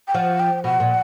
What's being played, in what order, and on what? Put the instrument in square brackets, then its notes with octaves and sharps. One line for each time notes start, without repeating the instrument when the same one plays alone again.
[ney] G5
[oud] F3 [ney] F#5
[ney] G5
[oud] B2 [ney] F#5
[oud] A#2